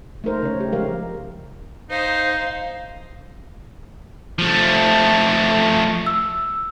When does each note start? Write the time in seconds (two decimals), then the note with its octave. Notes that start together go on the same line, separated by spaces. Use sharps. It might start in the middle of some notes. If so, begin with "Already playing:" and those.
0.24 A3 D#4 A#4 C5
0.42 C#3 A3 C#5
0.60 G4
0.72 C#3 F3 G#3 A#4 F5
1.91 D#4 C5 F5
4.39 F3 A3
6.06 E6